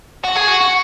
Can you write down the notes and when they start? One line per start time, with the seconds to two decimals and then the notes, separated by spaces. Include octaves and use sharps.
0.24 F#4
0.36 G#4
0.47 F#4
0.60 F#4